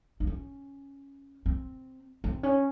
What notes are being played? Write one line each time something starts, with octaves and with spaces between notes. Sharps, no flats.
D#4
C#4
C4
C4
C#4